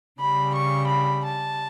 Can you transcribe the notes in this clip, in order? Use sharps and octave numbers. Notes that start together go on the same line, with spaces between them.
C#3 G3 B5
C#6
B5
A5